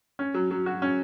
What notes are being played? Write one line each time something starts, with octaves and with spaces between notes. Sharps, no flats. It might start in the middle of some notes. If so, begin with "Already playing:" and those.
C#4
F#3
F#3
F#4
C#4